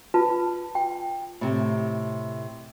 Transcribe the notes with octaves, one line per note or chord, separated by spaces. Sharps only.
F4 B4 A5
G5
A2 C3